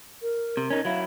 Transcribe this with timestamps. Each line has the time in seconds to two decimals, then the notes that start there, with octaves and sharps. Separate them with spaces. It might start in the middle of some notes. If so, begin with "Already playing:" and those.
0.22 A#4
0.57 C3
0.70 C#4 D#4
0.85 F#3 E4 F5